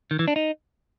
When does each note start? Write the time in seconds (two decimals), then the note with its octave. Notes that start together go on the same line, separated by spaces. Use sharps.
0.11 D#3
0.19 E3
0.28 D4
0.36 D#4